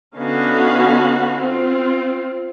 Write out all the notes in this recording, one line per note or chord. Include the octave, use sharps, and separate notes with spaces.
D3 B3 C#4 D#4 F#4 F5
C4 F4